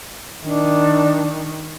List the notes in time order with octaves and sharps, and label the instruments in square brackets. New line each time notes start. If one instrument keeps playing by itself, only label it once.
[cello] D#3 [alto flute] D4